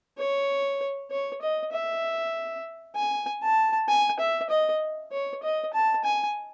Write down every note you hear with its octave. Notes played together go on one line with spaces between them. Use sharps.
C#5
C#5
D#5
E5
G#5
A5
G#5
E5
D#5
C#5
D#5
A5
G#5